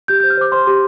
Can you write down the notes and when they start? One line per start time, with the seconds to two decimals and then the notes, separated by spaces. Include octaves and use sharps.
0.08 G4 G6
0.20 G6
0.23 C5
0.30 F6
0.37 C5 D6
0.52 C5 C6
0.67 G4